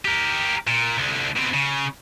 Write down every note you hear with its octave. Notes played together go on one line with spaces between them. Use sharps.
G4 A#4
A#2
C2 D3
B2 C4
C#3